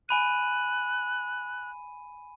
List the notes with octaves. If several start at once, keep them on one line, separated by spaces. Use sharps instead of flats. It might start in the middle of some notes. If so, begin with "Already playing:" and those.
G#5 B5 F#6 D#7